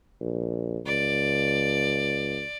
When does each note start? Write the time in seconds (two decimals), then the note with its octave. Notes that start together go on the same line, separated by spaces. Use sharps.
0.21 A#1
0.86 C#2 D5